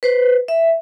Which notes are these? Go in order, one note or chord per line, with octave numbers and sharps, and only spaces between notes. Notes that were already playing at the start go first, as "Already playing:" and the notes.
B4 C5
E5